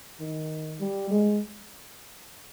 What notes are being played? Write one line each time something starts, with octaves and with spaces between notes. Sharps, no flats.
D#3
G3
G#3